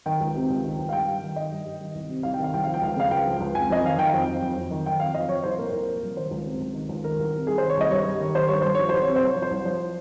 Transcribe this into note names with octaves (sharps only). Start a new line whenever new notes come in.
D#3 G5
C#2
C3
C#2
D#3
C#2
F5
G2 G5
G2
D#3
D#3 D#5
G2
G2
D#3
C2
C3
C2 F5
G5
D#3
F5
C2 G5
F3 F5
G5
C#2 F5
C#3 F5
C#2 G5
F3
C#2
F2 G#5
F2 D#5
D#3 F5
D#3 G5
F2
F2
F2
F2
D#3
D#3 G5
F2 F5
F2 D#5
F3 C#5
C2 C5
A#2 A#4
C2 A#4
F3
C2
D#3 C5
C#2
C3
C#2
D#3
C#2
D#3 A#4
C2
C3
C2 G#4
D#3 C5
C#5
C2 D#5
G2 C#5
G2
D#3
D#3 C5
G2 C#5
G2 C5
F3 C#5
C2 C5
C#5
C3
C5
C2
C#5
F3
C5
C2
F3 C5